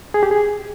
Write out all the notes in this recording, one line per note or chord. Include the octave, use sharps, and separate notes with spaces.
G#4
G4
G#4